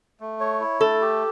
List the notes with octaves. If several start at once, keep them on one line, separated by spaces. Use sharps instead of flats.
A3
C#5
E4
A3 A4
G4